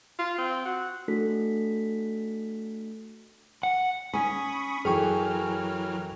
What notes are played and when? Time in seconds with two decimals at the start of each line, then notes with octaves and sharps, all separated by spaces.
0.19 F4
0.38 C4
0.66 F#4
1.08 A3 D4 F#4 A4 B6
3.63 F#5
4.13 C#4 G#5 B5 C#6 D#6
4.85 F#2 E3 F#3 G#4 A4 G5 C#6 F6